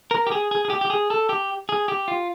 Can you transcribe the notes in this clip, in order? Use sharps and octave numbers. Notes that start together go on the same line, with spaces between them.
A#4
G4
G#4
G#4
G#4
G4
G4
G#4
A4
G4
G#4
G4
F4